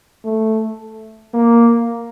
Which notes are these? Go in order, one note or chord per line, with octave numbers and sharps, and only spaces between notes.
A3
A#3